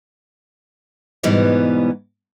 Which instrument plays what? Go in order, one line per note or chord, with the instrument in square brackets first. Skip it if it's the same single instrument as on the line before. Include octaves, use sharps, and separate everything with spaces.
[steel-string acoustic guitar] G#2 B2 E3 G3 B3